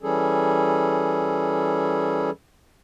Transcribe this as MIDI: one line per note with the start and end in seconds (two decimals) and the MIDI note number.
0.02 2.30 52
0.02 2.30 55
0.02 2.30 61
0.02 2.30 68
0.02 2.30 69